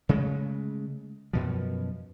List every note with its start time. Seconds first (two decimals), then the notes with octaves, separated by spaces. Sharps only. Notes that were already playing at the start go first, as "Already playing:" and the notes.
0.09 C#3 G#3 A3
1.33 F#2 B2 F3